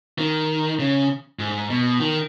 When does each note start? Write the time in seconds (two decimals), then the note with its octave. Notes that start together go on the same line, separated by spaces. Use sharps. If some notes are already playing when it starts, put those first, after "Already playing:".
0.18 D#3
0.79 C#3
1.39 G#2
1.70 B2
2.00 D#3